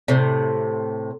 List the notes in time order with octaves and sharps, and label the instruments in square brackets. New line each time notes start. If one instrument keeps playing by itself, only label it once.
[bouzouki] A2 C3